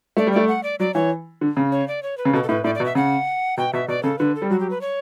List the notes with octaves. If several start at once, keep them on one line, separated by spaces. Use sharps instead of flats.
A3 D5
G3
A3 D5
F#5
D5
F#3 D5
E3 C#5
D3
C#3
C#5
D5
C#5
B4
C#3
B2 A4
A4
A2 B4
A2 D5
D5
B2
E5
C#3 F#5
B2 G5
B2 E5
B2 D5
C#3 A4
D3 B4
A4
G3
F#3 F#4
G4
B4
C#5